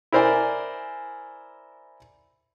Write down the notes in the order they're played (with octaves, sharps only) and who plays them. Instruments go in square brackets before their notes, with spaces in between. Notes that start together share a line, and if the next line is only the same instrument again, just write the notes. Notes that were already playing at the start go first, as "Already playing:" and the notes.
[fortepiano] E4 A#4 C5 D5 G#5